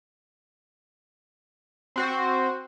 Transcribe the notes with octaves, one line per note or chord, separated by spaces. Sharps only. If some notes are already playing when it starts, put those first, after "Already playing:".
C4 F#4 C5